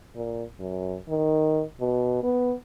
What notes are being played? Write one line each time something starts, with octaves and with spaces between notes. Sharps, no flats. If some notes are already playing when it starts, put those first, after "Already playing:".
A#2
F#2
D#3
B2
B3